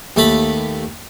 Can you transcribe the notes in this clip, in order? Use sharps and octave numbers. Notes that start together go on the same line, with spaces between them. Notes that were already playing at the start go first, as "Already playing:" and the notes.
D#2 A3 A5 B5